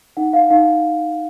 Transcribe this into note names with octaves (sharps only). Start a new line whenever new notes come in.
D#4 F#5
F5
D#4 F5